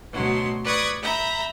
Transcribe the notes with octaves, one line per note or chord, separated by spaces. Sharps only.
D2 B2 F#3 C6
B4 D5 C#6 D#6 G#6
E5 A#5 B5 G6